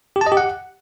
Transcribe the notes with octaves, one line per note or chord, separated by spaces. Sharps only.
G4
A5
D#5
G4
F#5